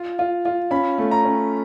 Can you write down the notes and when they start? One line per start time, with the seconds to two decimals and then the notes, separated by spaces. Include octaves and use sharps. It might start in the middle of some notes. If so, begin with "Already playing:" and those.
Already playing: F4 F5
0.19 F4
0.45 F4
0.71 C#4 B5
0.98 A3
1.11 A#5
1.25 C#4